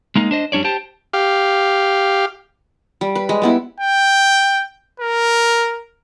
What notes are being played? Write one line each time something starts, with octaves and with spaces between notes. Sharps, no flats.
G#3 A#3 D#4
D4 C5 D#5
F#2 G3 D4 C#5 D5
G4 C5 G5 A5
G4 F5
G3
B4
G#3
G3 B3 E4
G5
A#4